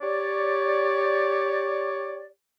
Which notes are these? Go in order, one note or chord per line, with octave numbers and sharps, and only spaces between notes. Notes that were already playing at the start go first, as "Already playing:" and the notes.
G4 C#5 D5